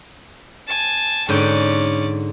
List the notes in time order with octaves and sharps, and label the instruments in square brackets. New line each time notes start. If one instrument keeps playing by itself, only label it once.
[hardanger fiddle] G#5 A5
[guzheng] G#2 D3 G5 [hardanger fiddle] C#4 D5